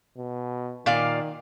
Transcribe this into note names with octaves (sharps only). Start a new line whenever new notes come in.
B2
A#2 D#3 D5 F5